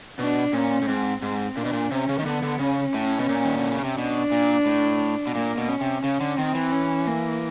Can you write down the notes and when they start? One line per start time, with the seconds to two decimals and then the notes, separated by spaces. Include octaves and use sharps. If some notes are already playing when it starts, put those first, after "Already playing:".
0.19 B2 D4
0.53 A#2 C#4
0.82 A2
0.88 G#2 C4
1.22 G#2 C4
1.56 A#2 D4
1.65 B2
1.73 A#2
1.90 C3 C#4
2.09 C#3
2.19 D#3
2.26 D3 B3
2.43 D3
2.59 C#3 C#4
2.94 A2
3.19 B2
3.29 A#2
3.45 D#3
3.58 D3
3.71 C#3
3.84 C3
3.97 B2 D4
4.32 A#2
4.66 A2
5.27 B2
5.35 A#2 A#3
5.58 B2
5.69 C#4
5.81 C3
6.04 C#3 C#4
6.21 D3
6.38 D#3 C4
6.55 E3
6.72 C#4
7.07 A#3